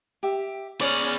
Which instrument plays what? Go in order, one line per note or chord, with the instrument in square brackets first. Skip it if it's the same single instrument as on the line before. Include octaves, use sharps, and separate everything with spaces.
[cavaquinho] G4 E5
[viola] C#4 [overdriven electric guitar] G#4 D5 [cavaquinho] B4 D6